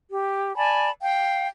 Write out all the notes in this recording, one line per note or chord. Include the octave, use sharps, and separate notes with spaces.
G4
D5 G#5 A5 B5
F5 G5